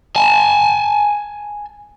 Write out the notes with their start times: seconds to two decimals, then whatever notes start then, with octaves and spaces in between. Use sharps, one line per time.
0.16 G#5 A5